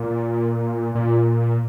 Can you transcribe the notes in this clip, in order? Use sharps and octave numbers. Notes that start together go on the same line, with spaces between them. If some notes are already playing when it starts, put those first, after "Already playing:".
Already playing: A#2
A#2